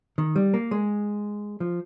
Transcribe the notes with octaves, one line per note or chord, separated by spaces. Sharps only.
D#3
G3
A#3
G#3
F3